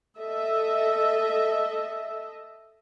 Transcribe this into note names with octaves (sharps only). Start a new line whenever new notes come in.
A4 D#5 E5